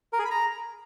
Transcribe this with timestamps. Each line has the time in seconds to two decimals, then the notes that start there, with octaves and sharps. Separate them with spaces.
0.13 A#4
0.19 G#4
0.25 B5
0.31 A#5